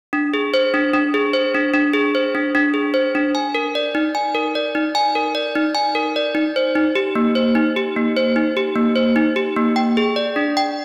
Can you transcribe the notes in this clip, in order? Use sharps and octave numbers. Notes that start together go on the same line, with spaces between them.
D4
G#4
C5
D4
D4
G#4
C5
D4
D4
G#4
C5
D4
D4
G#4
C5
D4
G#5
A#4
D5
D#4
G#5
A#4
D5
D#4
G#5
A#4
D5
D#4
G#5
A#4
D5
D#4
C5
D#4
G4
A#3
C5
D#4
G4
A#3
C5
D#4
G4
A#3
C5
D#4
G4
A#3
G5
G#4
D5
D4
G5